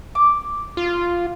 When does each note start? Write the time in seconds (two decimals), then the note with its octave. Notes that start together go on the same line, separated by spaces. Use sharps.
0.15 D6
0.77 F4